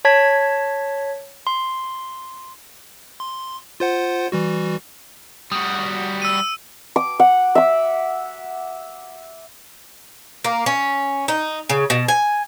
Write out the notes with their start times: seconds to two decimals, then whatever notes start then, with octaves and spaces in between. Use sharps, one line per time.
0.05 C#5 A5 G#6 B6
1.47 C6
3.20 C6
3.80 F4 C5 F#5
4.32 E3 G3 F#4
5.52 G3 F#4 D#6
6.22 E6 D#7
6.96 D6
7.20 F#5
7.55 E5 D6
10.44 A#3
10.66 C#4
11.28 D#4
11.70 C#3
11.90 B2
12.08 G#5